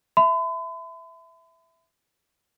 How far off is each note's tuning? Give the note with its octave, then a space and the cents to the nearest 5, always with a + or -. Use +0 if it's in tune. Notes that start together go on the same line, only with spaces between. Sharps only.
E5 +0 B5 +45